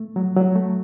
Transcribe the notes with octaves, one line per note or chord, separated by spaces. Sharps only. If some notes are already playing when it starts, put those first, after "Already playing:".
Already playing: A3
F#3
F#3
A3